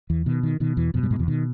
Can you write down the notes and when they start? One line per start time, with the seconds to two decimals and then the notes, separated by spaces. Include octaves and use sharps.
0.10 E2 E3
0.26 B2 D#3
0.43 D#3
0.60 B2 D#3
0.77 E2 E3
0.94 F2 B2 F3
1.03 G2 G3
1.11 G#2 G#3
1.19 E2 E3
1.28 B2 D#3